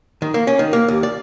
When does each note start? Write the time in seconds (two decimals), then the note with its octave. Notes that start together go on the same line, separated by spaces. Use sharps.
0.22 D#3
0.34 A#3
0.47 C#4
0.59 D#3
0.73 A#3
0.88 D#2
1.03 D5